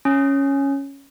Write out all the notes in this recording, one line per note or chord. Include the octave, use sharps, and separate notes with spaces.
C#4